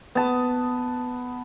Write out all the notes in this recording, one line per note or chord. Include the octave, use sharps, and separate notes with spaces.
B3 A5